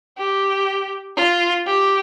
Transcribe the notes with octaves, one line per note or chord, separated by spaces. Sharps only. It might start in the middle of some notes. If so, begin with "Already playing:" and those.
G4
F4
G4